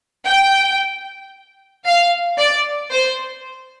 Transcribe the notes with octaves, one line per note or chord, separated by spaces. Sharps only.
G5
F5
D5
C5